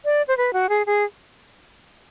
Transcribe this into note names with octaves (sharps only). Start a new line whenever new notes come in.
D5
C5
B4
F#4
G#4
G#4